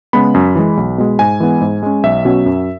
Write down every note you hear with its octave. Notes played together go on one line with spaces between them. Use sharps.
C#3 G#3 B3 B5
F#2
E3 G#3
B1
B2 G#3
G#2 G#5
E3 G#3 B3
G#2
G#3 C#4
B1 E5
B2 F#3 C#4
F#2